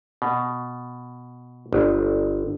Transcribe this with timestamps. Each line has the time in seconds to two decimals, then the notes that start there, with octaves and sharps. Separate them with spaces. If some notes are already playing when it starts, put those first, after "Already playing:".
0.22 B2
1.73 G1